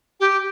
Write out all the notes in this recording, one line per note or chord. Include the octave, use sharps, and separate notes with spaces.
G4